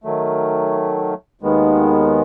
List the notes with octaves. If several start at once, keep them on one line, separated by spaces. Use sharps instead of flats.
D#3 F#3 A3
D#2 D#3 G#3 B3